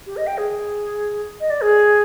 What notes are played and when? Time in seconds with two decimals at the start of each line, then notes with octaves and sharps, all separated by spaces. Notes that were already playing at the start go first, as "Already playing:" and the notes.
0.07 G4
0.17 D#5
0.27 G5
0.38 G#4
1.40 D#5
1.50 D5
1.62 G#4